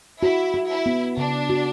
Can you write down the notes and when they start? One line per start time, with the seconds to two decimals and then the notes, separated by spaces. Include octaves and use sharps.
0.22 E4 F#4
0.54 F#4
0.70 E4
0.86 B3
1.17 C#3 D4
1.49 F#4